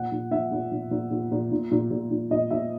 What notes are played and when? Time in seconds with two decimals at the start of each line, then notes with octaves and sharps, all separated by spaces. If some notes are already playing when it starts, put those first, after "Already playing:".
Already playing: A#2 F#5
0.12 A#2
0.31 A#2 E5
0.52 A#2
0.72 A#2
0.91 A#2
1.11 A#2
1.32 A#2
1.52 A#2
1.71 A#2
1.91 A#2
2.11 A#2
2.31 A#2 D#5
2.50 A#2 E5